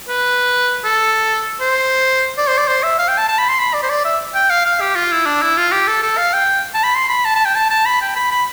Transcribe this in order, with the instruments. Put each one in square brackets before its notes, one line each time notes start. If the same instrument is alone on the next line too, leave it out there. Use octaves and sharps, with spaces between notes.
[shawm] B4
A4
C5
D5
C5
D5
C5
E5
F5
G5
A5
A5
B5
C6
B5
D5
C5
D5
E5
G5
F5
F5
G4
F4
E4
D4
E4
F4
G4
A4
A4
F5
G5
A5
B5
C6
B5
A5
A5
G5
A5
A5
B5
G5
B5
B5